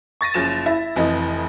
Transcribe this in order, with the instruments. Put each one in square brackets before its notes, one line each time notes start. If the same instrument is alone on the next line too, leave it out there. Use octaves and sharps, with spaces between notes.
[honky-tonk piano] C#6 A6 A#6 D#7
F#1 F3 C#4 A6 E7
E4
F1 F2 E3 D#5